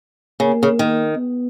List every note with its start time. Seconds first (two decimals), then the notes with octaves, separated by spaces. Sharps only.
0.40 C#3 A#3
0.63 C#3
0.79 D#3
1.17 B3